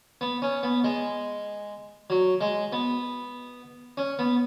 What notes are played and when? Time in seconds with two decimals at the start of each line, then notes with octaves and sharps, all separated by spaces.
0.21 B3
0.42 C#4
0.63 B3
0.84 G#3
2.10 F#3
2.41 G#3
2.72 B3
3.97 C#4
4.19 B3